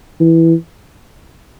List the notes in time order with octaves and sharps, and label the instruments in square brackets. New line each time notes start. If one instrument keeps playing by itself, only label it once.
[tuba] E3